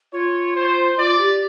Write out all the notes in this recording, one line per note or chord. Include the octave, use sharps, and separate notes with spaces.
F4 C#5
C5
F4 D5
G4